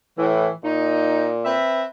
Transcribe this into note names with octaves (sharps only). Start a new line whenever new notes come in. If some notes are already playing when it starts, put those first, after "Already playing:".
A2 E3
A#2 D#4
C4 B4 E5